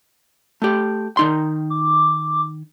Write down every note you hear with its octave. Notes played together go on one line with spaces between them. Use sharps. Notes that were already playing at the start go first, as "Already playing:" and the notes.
A3 G4
D#3 D#4 C6
D6